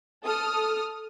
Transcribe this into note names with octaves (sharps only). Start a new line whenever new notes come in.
A4 D#6 F6